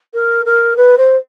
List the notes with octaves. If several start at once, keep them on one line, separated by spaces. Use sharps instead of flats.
A#4
A#4
B4
C5